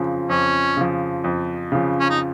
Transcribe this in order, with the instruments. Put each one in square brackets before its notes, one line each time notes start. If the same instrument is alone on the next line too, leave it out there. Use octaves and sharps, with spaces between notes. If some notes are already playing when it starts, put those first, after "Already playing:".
Already playing: [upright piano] F2 C#3 F3
[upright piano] F2 [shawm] C#4
[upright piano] C#3 F3
F2
C#3 F3
[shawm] C#4
D#4